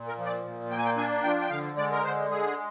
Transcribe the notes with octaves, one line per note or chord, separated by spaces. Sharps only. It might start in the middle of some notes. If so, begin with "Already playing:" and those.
Already playing: A#2
A#4
F3
D5
A#2
A#3 G5
G#5
G5
D4 G#5
F3 G5
G5
D3 F5
G#3 D5
A#4
D3 C5
G#3 G#4